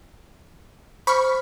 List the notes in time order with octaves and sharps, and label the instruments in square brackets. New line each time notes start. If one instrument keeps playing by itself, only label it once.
[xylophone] C5 F6 [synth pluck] B5 C#6